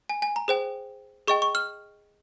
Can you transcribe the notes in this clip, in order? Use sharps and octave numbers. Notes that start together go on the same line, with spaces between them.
G#5
G#5
A#5
G#4 C5 G5
G#4 D#5 G5 C#6
C#6
F6